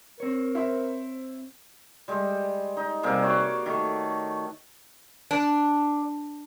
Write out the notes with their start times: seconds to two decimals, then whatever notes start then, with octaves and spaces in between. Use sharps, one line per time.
0.20 C4 A#4 C#5
0.55 E4 C5 E5
2.08 G3 G#3
2.77 D#4
3.03 C3 G3 A#3 G#4
3.22 F#4 C#5 D5
3.66 D#3 A3
5.31 D4